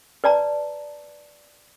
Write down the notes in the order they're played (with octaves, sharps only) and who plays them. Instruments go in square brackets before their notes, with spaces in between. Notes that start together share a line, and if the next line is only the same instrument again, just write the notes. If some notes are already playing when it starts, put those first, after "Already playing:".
[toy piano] B4 D5 A5 A#5